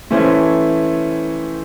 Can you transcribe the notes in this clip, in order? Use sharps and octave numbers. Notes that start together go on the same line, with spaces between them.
E3 A3 C#4 E4 C5